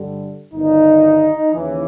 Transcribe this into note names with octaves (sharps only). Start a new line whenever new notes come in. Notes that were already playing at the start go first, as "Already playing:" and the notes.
Already playing: G2 D3 G3
G1 G2 D#3 D#4
D#2 C#3 E3